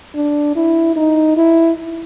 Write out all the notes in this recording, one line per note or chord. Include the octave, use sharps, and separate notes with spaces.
D4
E4
D#4
E4